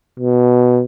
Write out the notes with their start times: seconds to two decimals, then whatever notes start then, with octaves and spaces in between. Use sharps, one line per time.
0.20 B2